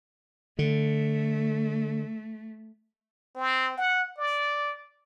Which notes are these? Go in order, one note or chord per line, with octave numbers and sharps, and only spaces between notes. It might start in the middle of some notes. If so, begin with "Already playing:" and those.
D3 A3
C4
F#5
D5